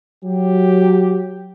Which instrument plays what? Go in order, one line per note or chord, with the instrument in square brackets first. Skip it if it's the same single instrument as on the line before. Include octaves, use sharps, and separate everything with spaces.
[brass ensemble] F#3 G4